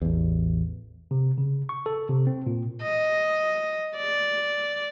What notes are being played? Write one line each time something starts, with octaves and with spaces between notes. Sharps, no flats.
A1 E2
C3
C#3
C#6
A4
C3
C4
A#2
D#5
D5